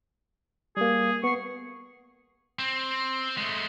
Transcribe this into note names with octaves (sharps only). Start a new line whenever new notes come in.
G3 A#3 G#4
B3 C#6 C7
C4
G#3 A3